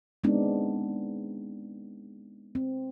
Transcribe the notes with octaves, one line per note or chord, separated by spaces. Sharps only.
G#3 B3 C4 D4 D#4
C4